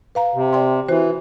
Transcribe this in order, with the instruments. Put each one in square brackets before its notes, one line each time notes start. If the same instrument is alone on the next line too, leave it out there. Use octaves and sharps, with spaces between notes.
[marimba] B4 F5 A#5
[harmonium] C3
[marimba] D5 G5 C6
[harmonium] E3 [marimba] F#4 C5